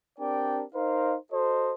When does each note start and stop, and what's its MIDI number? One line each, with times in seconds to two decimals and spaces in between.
0.19 0.63 60
0.19 0.63 62
0.19 0.63 67
0.19 0.63 70
0.19 0.63 74
0.19 0.63 79
0.74 1.15 63
0.74 1.15 70
0.74 1.15 72
0.74 1.15 75
0.74 1.15 77
1.31 1.74 66
1.31 1.74 69
1.31 1.74 72
1.31 1.74 75